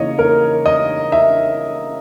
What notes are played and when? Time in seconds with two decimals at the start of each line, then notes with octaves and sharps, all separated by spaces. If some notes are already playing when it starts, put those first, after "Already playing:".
Already playing: C#3 E3 A#3 C#5 D#5
0.19 A#4
0.66 D#5
1.12 E5